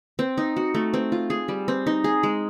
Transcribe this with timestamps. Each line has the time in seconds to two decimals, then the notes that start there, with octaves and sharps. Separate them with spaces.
0.19 C4
0.38 D#4
0.56 F#4
0.74 A3
0.94 C4
1.12 F4
1.30 G#4
1.48 G3
1.68 C4
1.87 D#4
2.04 G#4
2.23 G#3